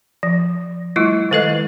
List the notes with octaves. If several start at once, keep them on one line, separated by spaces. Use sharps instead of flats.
F3
G3 A3 E4 F4
D#3 G#3 A4 B4 D#5